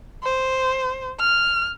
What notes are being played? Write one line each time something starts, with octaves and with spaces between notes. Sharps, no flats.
C5
F6